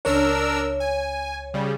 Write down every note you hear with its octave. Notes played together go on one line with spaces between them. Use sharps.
C#2 D4 A#4 C#5 E6
G#5
C#3 G3